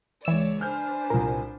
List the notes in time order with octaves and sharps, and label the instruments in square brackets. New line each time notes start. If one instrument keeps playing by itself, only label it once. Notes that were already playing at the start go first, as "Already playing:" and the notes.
[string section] C#2 C#5 D5 [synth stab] E3 E6
[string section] D4 B4 C5 [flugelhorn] G#5 [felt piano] F6 G6
[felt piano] C2 A#2 [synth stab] A#4